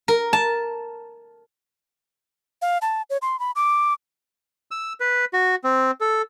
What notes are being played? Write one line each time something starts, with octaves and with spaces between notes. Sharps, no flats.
A#4
A5
F5
A5
C#5
C6
B5
D6
E6
B4
F#4
C4
A4